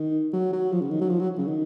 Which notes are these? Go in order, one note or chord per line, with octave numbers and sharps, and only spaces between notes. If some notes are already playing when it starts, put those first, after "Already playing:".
Already playing: D#3
F#3
F#3
F3
C#3
D#3
F#3
F3
F#3
C#3
D#3